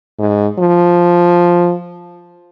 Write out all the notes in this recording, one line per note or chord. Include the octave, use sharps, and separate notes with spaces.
G#2
F3